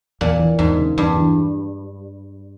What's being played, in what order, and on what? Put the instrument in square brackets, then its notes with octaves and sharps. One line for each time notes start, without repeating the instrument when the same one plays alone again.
[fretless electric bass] E2 [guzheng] A#2
[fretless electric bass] E3
[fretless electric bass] E2 [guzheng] G#2
[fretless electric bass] C#3
[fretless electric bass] E2 [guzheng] G2
[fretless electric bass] E3